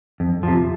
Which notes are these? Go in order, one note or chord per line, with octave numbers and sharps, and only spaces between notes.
F2
C3 F3